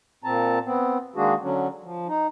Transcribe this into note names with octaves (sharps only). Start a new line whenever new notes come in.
A#2 C4 A5 A#5
B3 C4
D#3 G#3 A#3 D4 F#4 G#4
D3 F#3 C#4
F3
D#4